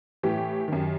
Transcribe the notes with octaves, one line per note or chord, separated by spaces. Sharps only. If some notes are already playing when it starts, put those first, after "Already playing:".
A2 E3 G4
F#2 D#3